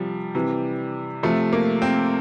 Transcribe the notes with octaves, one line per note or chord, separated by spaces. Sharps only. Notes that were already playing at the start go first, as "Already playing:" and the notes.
Already playing: C3 F3 G3
C3 E3
C3 F3 A3
A#3
C4